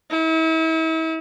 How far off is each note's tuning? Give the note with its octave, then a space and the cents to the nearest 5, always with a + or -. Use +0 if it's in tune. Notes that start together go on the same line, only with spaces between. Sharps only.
E4 -40